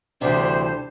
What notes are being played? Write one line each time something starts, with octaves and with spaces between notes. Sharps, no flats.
D2 C3 E3 G3 D4 C5